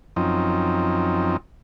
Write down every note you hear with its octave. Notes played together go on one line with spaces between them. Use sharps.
F#2 F3 C4 D#4